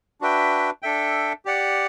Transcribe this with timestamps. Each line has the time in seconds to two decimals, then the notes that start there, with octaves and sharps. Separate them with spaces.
0.21 D4 F#4 B4 E5 G5
0.82 D4 A4 E5 G5
1.45 G4 D5 F#5